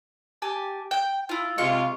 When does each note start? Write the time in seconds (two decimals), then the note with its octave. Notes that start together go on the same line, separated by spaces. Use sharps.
0.42 G4 G#5 A5
0.91 G5
1.29 E4 F4
1.58 C3 G#3 F4 C#6